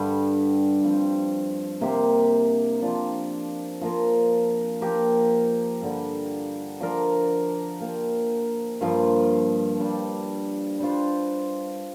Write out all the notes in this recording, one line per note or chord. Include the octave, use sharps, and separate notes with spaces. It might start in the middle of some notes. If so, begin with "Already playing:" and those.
Already playing: G2 D3 G3
G2 F3 C4
C3 A#3 G4 C5
F3 D4 F4
F3 A#3 F4 A#4
F3 A#3 G4 A#4
G2 D3 G3
F3 D4 A#4
F3 A#3 G4
G2 F3 A#3 F4
G2 G3 D4
G3 D4 F4 C5